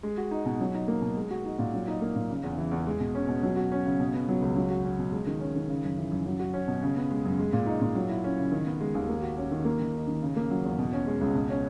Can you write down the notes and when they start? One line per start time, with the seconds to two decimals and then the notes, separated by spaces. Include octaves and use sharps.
0.03 G#3
0.17 F#4
0.31 D#4
0.46 B2
0.60 F#3
0.75 D#4
0.88 A#3
1.02 B2
1.17 G#3
1.31 F#4
1.45 D#4
1.59 A#2
1.74 F#3
1.88 D#4
2.02 A#3
2.16 A#2
2.30 C#3
2.44 E2
2.58 E3
2.71 E2
2.87 G#3
3.00 B2
3.15 C#4
3.28 B2
3.43 F#3
3.56 F#4
3.72 C#4
3.85 C#3
4.00 B2
4.14 B3
4.28 F#3
4.42 C#2
4.56 F#3
4.70 F#4
4.84 C#4
4.99 B2
5.12 G#3
5.27 D#3
5.40 C#4
5.55 D#3
5.69 C#3
5.83 F#2
5.97 E3
6.11 F#2
6.26 F#3
6.40 F#4
6.54 C#4
6.68 B2
6.83 C#3
6.96 B3
7.11 G#3
7.25 F#2
7.39 G#3
7.53 A#2
7.67 D#4
7.82 A#2
7.95 F#3
8.09 E4
8.24 C#4
8.38 C#3
8.52 D#3
8.66 B3
8.81 G#3
8.95 D#2
9.09 A#3
9.22 F#4
9.38 C#4
9.51 D#3
9.65 A#3
9.79 D#3
9.94 D#4
10.07 D#3
10.22 C#3
10.36 A#3
10.50 F#3
10.64 E2
10.79 B2
10.93 C#4
11.07 G#3
11.21 C#2
11.35 B2
11.50 C#4